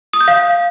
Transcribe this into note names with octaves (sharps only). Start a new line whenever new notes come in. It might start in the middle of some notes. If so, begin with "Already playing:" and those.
D#6
G6
F5